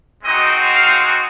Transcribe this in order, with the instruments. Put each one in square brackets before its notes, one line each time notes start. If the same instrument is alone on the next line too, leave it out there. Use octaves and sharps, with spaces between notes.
[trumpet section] G#3 C4 D#4 F#4 D#5
F5